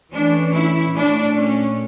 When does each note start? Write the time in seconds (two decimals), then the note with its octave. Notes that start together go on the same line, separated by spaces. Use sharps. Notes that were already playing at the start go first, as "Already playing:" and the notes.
0.12 E3 A3 C#4 D4
0.53 E4
0.95 A#2 A3 C#4 D4
1.36 C#4